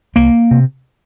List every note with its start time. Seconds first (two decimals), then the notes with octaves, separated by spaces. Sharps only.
0.16 C2 A#3
0.51 C3